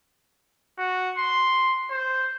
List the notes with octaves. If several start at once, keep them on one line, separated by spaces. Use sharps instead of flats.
F#4
C6
C5